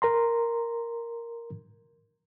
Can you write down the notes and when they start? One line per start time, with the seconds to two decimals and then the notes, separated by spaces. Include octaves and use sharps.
0.02 A#4 A#5 C6